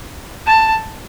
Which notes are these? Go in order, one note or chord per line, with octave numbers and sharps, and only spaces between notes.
A5